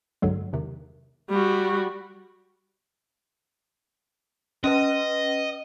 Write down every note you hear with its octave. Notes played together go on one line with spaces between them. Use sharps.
B1 G2 D3 F#3 G#3
E2 C3 D#3
G3 F#4
C#4 B4 D#5